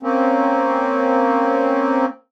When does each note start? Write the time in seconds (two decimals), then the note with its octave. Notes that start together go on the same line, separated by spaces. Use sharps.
0.03 A#3 C4 C#4